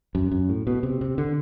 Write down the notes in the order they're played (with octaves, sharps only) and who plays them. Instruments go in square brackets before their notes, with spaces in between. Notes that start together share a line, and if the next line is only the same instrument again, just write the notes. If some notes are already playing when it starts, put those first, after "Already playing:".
[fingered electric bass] F#2
F#2
A2
B2
C3
C3
D3